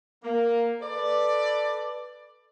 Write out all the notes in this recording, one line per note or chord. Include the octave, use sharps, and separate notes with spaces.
A#3
A4 B4 D5